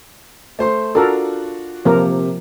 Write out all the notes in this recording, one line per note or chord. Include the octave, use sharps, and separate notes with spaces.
A3 C5 C6
D4 F4 F#4 A4 A#4
C3 F3 A#3 A#4